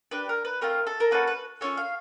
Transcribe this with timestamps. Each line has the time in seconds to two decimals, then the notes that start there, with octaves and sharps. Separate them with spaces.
0.11 D4 G4 B4
0.29 A#4
0.45 B4
0.61 A3 C4 F4 A#4
0.87 A4
1.00 A#4
1.11 A#3 C#4 F#4 A4 B4
1.27 B4
1.61 A3 C#4 F4 C#5
1.77 F5